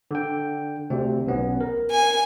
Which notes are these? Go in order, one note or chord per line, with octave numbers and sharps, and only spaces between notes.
D3 G5
D2 C3 C4
B1 B3 C#4
A#4
G#5